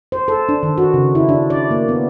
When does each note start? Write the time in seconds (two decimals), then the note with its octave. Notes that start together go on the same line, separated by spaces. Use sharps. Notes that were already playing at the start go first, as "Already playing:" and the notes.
0.12 C5
0.28 A4
0.49 D4
0.63 D#3
0.78 F#4
0.94 C#3
1.15 E4
1.29 D4
1.50 D5
1.71 A#3
1.88 B3